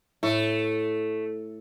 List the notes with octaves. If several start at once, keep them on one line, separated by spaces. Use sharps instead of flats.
A2 A3